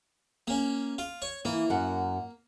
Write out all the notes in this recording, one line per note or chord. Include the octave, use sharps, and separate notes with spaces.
A#3 C#4
F4
C#5
E3 A#3
F#2 F#5